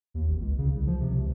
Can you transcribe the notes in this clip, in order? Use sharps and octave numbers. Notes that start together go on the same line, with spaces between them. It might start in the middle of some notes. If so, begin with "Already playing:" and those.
D#2
G#1
C#2
C#3
C2
F3
C3
C#2